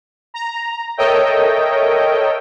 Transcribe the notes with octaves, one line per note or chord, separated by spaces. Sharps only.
A#5
A4 A#4 C#5 D#5 E5 G5